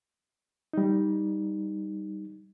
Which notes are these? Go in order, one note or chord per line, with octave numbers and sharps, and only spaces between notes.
G3 D#4